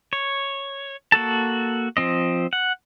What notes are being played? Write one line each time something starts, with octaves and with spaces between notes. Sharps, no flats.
C#5
A#3 F#4 A4 A5
F3 C4 D#5
F#5